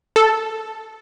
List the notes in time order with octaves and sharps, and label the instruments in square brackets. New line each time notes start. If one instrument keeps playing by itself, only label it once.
[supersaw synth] A4